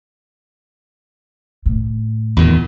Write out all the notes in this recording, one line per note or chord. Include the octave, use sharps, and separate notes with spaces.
A2
E2 A#2 D#3